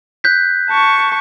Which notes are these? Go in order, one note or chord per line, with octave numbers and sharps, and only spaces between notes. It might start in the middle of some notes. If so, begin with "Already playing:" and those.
F#6 G6 B6
A5 C#6